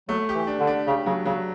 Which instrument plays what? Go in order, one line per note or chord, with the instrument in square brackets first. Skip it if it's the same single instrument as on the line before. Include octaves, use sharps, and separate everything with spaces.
[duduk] F#3 [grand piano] A3
[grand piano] G4
[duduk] E3
[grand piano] D4
[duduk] D3
[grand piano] D4
[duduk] C#3 [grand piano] G4
[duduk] C#3 [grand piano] F#3
[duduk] C#3 [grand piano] F#3